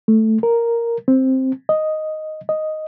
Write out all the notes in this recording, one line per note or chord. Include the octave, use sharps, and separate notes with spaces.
A3
A#4
C4
D#5
D#5